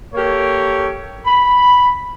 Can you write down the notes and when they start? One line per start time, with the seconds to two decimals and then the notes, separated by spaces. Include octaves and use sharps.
0.14 A#3 G4 A4 A#4 C#5
1.25 B5